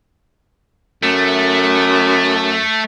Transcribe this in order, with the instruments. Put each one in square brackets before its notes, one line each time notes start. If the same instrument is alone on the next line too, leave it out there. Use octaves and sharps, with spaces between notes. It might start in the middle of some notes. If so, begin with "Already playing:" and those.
[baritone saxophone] F#2 [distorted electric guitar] A3